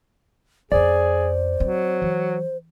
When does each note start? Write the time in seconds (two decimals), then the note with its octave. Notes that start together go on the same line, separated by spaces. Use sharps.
0.72 F2 C#4 G#4 C5 D5
1.60 F#3 C4
2.02 E3